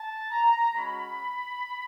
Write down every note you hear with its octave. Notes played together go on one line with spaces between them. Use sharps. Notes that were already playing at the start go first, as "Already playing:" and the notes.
Already playing: A5
A#5
G#3 C#4 F#4 B5